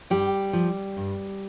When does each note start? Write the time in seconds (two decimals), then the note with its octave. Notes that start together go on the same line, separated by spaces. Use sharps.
0.10 G2 G3 G4
0.53 F3
0.97 G2